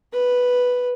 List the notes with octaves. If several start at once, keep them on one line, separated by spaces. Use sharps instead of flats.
B4